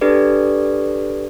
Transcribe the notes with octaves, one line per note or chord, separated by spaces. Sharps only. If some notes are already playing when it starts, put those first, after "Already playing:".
D4 G4 A4 B4 D5